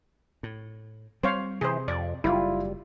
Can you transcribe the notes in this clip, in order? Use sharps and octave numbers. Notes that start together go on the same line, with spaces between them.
A2
G3 C4 C5 C#5 F5
C3 E3 G#4 C5
F2 D5
F#1 G3 E4 F4